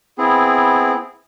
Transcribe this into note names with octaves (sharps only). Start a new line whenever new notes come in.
B3 C4 E4 G#4